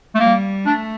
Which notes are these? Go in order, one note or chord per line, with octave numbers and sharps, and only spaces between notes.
A3
G3 A#3
A3 D4